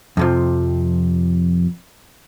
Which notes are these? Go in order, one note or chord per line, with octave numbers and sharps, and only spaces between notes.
F2 C3 F3